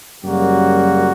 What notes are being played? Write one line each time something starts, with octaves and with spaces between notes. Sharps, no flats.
F#2 C#3 G3 A#3 F#4